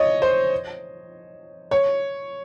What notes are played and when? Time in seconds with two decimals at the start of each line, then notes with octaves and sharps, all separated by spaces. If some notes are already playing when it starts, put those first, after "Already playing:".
Already playing: C#5 D#5
0.22 C5
1.71 C#5